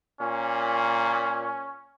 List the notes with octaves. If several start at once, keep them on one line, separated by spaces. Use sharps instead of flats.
A#2 C#4